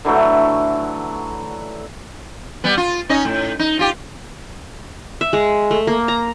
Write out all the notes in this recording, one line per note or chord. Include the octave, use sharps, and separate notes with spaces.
D3 E3 F#3 A3
G3 B3
F4
C#4 D#4 D#5
A2
D#4
F4 G4
E5
G#3
A3
A#3
A#5